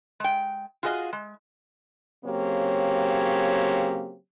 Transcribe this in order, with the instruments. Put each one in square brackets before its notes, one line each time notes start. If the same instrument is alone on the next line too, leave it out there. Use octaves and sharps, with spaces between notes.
[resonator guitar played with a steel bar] G#3 G5
F4 F#4 G#4 B4 D#5 F5
G#3
[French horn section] C#3 F#3 A#3 C4 G4 C#5